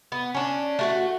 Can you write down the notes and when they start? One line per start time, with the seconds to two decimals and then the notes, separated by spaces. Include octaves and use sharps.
0.12 B3
0.34 C#4 D4
0.79 A3 F#4 F#5